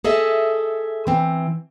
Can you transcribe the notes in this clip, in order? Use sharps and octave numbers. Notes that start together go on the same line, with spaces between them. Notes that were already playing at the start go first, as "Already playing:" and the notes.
G#4 A4 D#5 E5
E3 C4